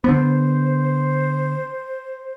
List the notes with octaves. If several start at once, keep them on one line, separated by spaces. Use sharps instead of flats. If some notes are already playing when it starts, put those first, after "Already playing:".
D3 B3 C5